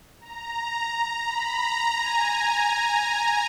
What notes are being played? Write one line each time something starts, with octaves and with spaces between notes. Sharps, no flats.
A#5
B5
A#5
G#5